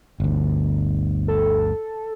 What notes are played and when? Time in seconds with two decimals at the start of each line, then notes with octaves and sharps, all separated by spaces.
0.20 G1 D2
1.28 A4